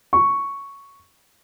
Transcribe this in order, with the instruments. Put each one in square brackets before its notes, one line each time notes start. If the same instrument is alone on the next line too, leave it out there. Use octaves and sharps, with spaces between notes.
[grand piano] C#6